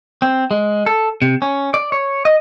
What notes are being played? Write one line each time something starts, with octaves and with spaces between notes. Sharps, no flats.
C4
G#3
A4
C3
C#4
D5
C#5
D#5